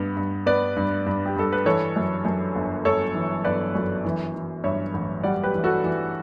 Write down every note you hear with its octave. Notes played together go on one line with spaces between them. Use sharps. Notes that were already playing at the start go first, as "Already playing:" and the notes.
Already playing: G2 B3
G2
B3 B4 D5
G2
G2
G4
G2 A4
B4
E3 A4 C#5
F#2
F#2
G1
G1 A4 C#5
E3
G1 B4 D5
F#2
E3
E3
G2 C#5 E5
A1
G3 D5 F#5
G4 B4
E3
F#4 A4
E3